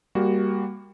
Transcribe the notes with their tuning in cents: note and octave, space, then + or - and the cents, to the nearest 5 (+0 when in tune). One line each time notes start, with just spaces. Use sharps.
G3 +20 A#3 +5 F#4 +0